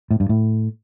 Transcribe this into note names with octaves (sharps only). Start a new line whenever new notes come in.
A2
G2
A2